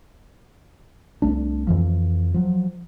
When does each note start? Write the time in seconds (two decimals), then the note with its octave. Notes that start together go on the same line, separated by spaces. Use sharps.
1.22 C2 A3 D4
1.67 F2 E3 F3
2.34 F3 F#3